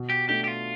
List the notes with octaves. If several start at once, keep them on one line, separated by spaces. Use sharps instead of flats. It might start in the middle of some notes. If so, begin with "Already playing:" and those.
Already playing: B2
G4
A3 D4 G4
G4
F4